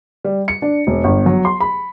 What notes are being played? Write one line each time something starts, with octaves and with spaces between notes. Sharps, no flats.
G3
C#7
D4
E1
G1
F#3
C6
B5